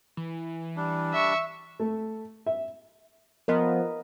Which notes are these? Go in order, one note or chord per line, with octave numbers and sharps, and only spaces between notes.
E3
G3 D4
E5 C#6
A3
E5
F3 B3 A#4 D#5